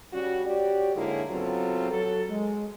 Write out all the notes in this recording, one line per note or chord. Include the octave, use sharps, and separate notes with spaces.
C#3 G3 F#4
F#4 G4 C#5 D5
G#2 D3 A#3 E4 G#4 C#5
C#3 F#3 B3 C4 F4 A4
F#3 A4
G#3